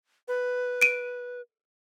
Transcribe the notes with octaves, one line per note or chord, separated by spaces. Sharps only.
B4
D7 D#7